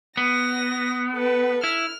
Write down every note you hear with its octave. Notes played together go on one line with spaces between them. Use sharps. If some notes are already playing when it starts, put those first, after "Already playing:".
B3 A#6
A4 B4
E4 F6